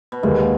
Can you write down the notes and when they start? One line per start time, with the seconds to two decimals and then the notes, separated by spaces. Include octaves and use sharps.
0.12 B2
0.23 D#2 A#2 D#3 G#3 D#4